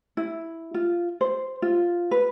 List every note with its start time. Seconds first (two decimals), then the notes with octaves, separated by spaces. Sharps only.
0.17 E4
0.74 F4
1.21 C5
1.62 F4
2.11 B4